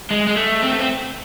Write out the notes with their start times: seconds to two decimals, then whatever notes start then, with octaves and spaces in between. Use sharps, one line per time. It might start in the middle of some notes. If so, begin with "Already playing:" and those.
0.11 G#3
0.27 G#3
0.36 A3
0.62 C4
0.71 A3
0.79 C4